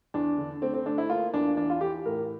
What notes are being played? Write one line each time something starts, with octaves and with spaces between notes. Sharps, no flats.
E2 D4
D3
A3 C4
C4
A3 D4
E4
A#3 F4
E2 D4
E3 D4
F4
E3 G4
A2 A#4